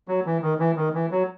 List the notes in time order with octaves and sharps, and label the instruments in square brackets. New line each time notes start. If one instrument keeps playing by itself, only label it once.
[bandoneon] F#3
E3
D#3
E3
D#3
E3
F#3